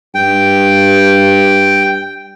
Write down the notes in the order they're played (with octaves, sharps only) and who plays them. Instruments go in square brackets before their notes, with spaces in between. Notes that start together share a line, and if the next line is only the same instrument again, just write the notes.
[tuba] G2 [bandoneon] G5